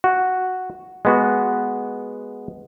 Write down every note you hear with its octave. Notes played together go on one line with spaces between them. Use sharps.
F#4
G#3 B3 F#4